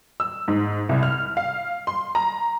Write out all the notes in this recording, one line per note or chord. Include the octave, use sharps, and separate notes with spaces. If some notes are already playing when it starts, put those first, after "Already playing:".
E6
G#2
C2
F6
F5
C6
A#5